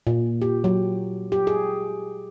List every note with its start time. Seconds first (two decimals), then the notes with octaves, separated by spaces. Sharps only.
0.07 A#2
0.42 G4
0.64 F#3
1.32 G4
1.47 G#4